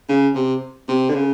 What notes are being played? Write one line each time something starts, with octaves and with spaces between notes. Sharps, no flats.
C#3
C3
C3
D3
C#3